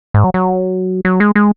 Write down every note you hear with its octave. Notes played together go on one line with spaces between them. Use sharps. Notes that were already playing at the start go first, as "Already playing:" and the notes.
G#2
F#3
F#3
F#3
G#3
G#3